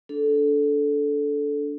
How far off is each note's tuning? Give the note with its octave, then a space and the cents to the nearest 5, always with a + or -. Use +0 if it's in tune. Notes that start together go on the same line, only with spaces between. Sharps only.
D4 -20 A4 -10